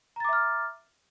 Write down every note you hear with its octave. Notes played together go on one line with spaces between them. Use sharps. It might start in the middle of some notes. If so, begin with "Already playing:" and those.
E5 A#5 D6 F6 A6